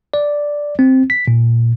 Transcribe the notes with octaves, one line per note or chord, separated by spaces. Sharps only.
D5
C4
B6
A#2